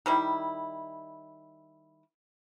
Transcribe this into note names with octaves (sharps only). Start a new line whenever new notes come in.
D#3 G3 E4